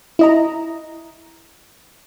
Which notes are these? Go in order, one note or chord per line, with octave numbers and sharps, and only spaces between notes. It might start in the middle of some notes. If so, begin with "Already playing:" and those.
E4 D#5 A#5